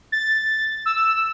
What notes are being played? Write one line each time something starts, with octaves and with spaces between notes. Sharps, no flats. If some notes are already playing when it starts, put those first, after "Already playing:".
A6
E6